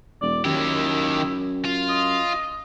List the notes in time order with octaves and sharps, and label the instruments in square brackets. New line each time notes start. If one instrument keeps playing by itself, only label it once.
[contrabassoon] E1 [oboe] D5
[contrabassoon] F#2 [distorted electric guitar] D#3 G4 [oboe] E4
[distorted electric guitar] F4
[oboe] D#5